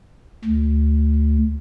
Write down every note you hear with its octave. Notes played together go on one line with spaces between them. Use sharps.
D2